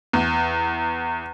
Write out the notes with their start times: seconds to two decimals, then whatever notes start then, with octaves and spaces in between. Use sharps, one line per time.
0.13 E2